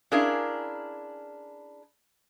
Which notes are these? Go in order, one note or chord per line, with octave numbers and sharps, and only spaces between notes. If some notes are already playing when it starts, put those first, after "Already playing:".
C#4 D4 E4 G#4 A#4 F5